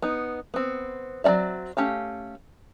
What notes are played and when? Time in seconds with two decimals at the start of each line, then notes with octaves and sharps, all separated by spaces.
0.02 B3 D#4
0.54 B3 C4
1.24 F#3 C4 C#4 D5 E5
1.77 A3 C#4 G4 F5